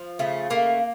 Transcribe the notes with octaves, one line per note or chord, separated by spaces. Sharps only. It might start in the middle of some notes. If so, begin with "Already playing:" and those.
Already playing: F3
C#3 A3
A3 A#3